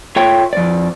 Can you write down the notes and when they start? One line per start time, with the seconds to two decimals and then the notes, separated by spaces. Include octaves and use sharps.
0.16 F4 A4 C#5 E5 G5
0.53 F2 D5